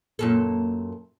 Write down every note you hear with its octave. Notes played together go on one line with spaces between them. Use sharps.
F#2 A#2 A4